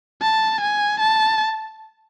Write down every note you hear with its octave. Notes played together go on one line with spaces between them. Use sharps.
A5
G#5
A5